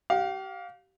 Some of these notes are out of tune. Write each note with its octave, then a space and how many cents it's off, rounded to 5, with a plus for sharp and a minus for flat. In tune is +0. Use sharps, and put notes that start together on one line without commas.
G4 -35 F5 +20